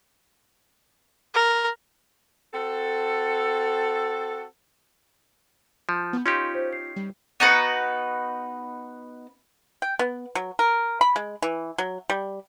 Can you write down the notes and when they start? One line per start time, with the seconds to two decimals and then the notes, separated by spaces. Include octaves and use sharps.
1.35 A#4
2.54 C4 F#4 A4
5.89 F3 G6
6.13 B3
6.26 C#4 D#4 F4 G4 C6 C#6
6.54 C5
6.73 C7
6.96 G3
7.40 B3 D#4 F#4 B4
9.82 G5
9.99 B3
10.35 F#3
10.59 A#4
11.01 B5
11.16 G#3
11.42 E3
11.78 F#3
12.10 G3